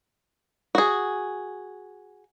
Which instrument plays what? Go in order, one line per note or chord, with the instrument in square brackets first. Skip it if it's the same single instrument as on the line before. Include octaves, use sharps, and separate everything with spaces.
[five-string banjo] F#4 G#4